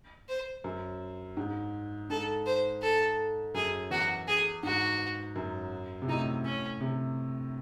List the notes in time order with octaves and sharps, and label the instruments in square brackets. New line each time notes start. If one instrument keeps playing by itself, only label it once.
[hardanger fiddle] C5
[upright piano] F#2
G#2
[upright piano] G#2 [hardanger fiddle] A4
[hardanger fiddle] C5
A4
[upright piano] F#2 [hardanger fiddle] G#4
[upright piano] E2 [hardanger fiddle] F#4
[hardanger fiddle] G#4
[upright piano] G#2 [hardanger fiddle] F#4
[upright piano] F#2
C3
[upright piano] A2 [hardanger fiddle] D#4
[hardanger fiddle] C#4
[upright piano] C3